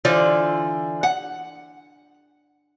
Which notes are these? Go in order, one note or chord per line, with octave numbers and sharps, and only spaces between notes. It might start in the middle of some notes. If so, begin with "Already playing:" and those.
D3 E3 F4 C5 D5
F#5